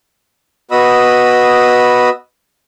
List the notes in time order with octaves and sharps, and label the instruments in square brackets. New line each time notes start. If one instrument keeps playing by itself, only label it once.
[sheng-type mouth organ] B3 F#4 D#5 B5 D#6 E6